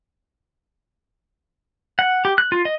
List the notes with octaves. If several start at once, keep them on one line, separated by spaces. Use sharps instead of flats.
F#5
G4
F#6
F4
D#5